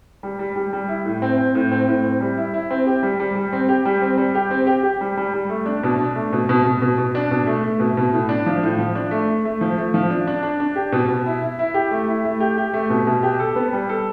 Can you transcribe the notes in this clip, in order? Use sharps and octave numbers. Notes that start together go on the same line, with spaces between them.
G3
G3
G3
G3
E4
A2
C4
C4
A2
C4
A2
C4
G3
E4
E4
C4
G4
G3
G3
G3
C4
G4
G3
C4
G3
G4
C4
G4
G4
G3
G3
G3
A3
D4
B2
D4
A3
B2
B2
B2
B2
B2
D4
B2
A3
A3
B2
B2
A2
D4
F3
A2
F3
D4
A3
A3
A3
F3
A3
F3
D4
D4
D4
D4
G4
B2
B2
E4
E4
E4
G4
A3
E4
A3
G4
G4
A3
B2
B2
G4
A4
B3
G3
A4